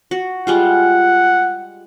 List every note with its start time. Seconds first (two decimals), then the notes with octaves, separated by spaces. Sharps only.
0.11 F#4
0.47 G3 G#3 F4 F#5